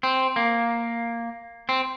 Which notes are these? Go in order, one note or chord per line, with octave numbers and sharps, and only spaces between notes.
C4
A#3
C4